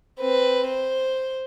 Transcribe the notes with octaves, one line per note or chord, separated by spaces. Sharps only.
C4 B4
C5